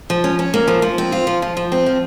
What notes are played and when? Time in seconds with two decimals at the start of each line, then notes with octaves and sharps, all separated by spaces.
0.10 F3
0.24 C#4
0.39 C#4
0.54 A#3
0.68 F3
0.82 F3
0.98 C4
1.12 F4
1.27 F3
1.42 F3
1.57 F3
1.72 C4
1.86 F3